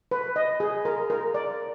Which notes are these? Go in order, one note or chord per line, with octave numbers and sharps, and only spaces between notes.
B4
D#5
G#4
A#4
A#4
D5